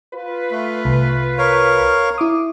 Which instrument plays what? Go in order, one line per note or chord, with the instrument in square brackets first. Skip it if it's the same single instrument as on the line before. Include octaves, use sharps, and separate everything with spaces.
[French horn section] F4 B4
[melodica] A3
[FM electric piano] C2
[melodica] A#4 C#5 F5
[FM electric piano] E4 D6 D#6